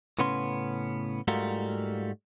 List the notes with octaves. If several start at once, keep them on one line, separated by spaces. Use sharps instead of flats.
A2 C#3 B3 C#4 C6
G#2 G3 A3 F4 F#4 A#4